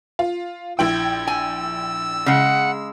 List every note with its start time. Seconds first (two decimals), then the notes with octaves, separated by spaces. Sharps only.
0.19 F4
0.79 A#1 E4 G5 E6 G#6
1.27 G#5 E6
2.26 C#3 G#3 F#5